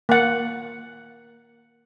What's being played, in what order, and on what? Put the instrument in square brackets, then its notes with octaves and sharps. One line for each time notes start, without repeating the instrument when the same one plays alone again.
[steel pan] A#3 F#5